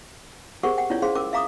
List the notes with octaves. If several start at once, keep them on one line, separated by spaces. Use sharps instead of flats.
G4 G#4 A#4 C5 F#5 C#6
F#5 G5
C#4 E4 F4 C#5 D5
C#4 G#4 C5 F5 C6
C#4 A#4 D6 E6
E5 F5 A#5 D6 D#6